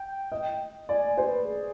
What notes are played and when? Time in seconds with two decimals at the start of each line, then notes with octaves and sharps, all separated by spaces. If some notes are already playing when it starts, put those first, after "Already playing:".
Already playing: G5
0.32 D#5
0.88 D5 G#5
1.07 G#5
1.18 C5
1.27 B4
1.45 G#4